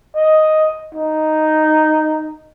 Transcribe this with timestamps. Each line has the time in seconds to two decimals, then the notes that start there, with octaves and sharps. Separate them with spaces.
0.15 D#5
0.95 D#4